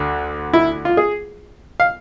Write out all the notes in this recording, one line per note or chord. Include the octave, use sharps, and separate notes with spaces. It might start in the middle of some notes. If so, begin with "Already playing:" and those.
Already playing: D2 D3
E4
F4
G#4
F5